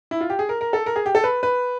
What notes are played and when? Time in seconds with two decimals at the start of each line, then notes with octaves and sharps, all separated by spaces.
0.11 E4
0.21 F4
0.30 G4
0.39 G#4
0.49 A#4
0.61 A#4
0.73 A4
0.86 A#4
0.96 G#4
1.06 G4
1.15 A4
1.24 B4
1.43 B4